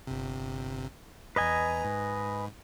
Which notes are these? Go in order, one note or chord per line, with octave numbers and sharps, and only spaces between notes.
G1 C3
E2 B4 D#5 G#5 A#5
G#2